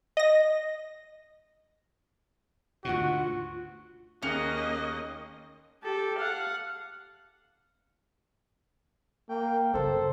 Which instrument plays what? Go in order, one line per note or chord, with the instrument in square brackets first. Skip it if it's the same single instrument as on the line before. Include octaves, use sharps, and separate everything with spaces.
[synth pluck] D#5 A#6
[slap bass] D2 G#2 B2 [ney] F4 [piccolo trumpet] F#4
[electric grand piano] D#2 G#4 F#6 [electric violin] A#3 D#5 [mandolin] C#4
[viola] G4 A4
F5 F#5
[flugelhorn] A#3 [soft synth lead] G5
[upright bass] F#2 C#3 [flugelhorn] A4 [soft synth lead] C5